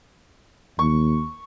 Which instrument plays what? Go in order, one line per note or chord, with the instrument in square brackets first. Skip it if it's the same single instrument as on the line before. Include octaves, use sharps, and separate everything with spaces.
[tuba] D#2 [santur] C#6